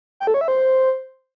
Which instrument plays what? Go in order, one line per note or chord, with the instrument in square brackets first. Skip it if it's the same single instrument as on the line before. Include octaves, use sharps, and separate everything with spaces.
[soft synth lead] G5
A4
C#5
E5
C5